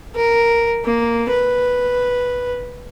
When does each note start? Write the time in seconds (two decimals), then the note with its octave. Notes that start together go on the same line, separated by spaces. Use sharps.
0.15 A#4
0.84 A#3
1.30 B4